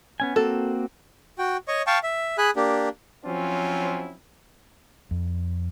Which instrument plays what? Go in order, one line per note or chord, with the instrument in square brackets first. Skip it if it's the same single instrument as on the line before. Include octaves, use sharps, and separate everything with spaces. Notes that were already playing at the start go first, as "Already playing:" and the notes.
[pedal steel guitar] B3 C#4 G#5
[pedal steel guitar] A#3 C4 F#4 [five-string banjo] A4
[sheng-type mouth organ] F#4 G5
C#5 D#5 C#6
F5 G5 A5 C#6
E5
G#4 G#5 B5 F#6
A#3 D4 G4
[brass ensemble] F3 F#3 C4 C#4 E4 F4
[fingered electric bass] F2